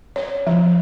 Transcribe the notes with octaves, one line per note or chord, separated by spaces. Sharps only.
C#5
F3